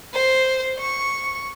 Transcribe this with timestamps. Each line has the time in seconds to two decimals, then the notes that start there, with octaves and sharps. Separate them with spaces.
0.14 C5
0.80 C#6